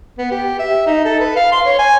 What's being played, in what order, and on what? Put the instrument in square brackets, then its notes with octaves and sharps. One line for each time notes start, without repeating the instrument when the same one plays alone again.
[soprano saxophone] B3
G4
E5
D#4
A4
B4
F5
C6
C#5
G#5